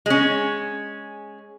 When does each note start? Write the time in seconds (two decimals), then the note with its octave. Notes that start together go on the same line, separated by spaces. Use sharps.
0.06 G#3 C#4